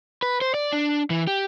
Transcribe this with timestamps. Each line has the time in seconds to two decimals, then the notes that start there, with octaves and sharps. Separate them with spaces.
0.22 B4
0.41 C5
0.54 D5
0.73 D4
1.10 E3
1.27 G4